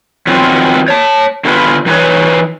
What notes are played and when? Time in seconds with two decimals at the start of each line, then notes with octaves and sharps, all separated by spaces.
0.27 D#3 F#3 B3 C4 F4
0.88 C#5 A5
1.45 D3 B3 D4 E4 F4 B4
1.86 E3 D#4 F#4 A4 B4 C#5